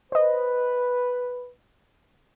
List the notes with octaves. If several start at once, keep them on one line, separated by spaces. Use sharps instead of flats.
B4 C5 D#5